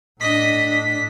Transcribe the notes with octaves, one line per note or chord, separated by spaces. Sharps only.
A2 D4 D#5 B6